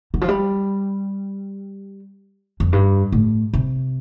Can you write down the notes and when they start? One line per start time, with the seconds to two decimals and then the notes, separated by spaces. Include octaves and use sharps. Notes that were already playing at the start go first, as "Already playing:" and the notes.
0.14 D3
0.21 F3
0.28 G3
2.60 F2
2.73 G2
3.12 A2
3.54 C3